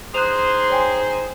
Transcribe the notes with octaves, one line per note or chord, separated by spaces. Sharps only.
D#4 G#4 C5 C6 F#6 F7
C#5 G5 G#5